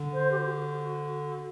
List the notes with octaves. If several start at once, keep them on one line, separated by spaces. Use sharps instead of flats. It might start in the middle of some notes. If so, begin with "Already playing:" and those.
Already playing: D3
C5
G4
F#4